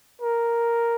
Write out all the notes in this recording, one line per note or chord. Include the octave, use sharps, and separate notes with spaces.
A#4